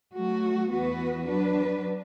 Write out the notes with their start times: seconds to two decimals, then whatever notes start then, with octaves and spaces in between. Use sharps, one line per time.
0.14 F#3 A3 F#4
0.70 E2 E3 B3 F#4 B4
1.27 F#3 D4 B4